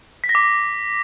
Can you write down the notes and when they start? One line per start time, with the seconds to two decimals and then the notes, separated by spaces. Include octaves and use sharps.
0.24 B6
0.29 A#6
0.35 D6